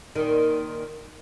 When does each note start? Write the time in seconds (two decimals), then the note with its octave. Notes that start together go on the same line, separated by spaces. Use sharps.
0.15 A#2 D#3